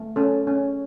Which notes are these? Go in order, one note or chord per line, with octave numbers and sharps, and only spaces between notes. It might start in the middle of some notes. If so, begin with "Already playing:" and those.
Already playing: A3
C#4 A4
C#4